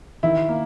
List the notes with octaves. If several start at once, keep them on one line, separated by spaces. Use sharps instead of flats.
D#3 E4
A#3